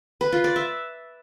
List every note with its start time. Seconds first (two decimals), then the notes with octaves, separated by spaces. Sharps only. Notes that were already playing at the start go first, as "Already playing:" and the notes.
0.21 B4
0.32 F4
0.44 D5
0.56 E5